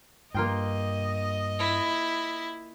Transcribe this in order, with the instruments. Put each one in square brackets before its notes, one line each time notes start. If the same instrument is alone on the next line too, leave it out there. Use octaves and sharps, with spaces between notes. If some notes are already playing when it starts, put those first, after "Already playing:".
[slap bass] G2 [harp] A#3 F4 G5 [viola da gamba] D#5
[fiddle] E4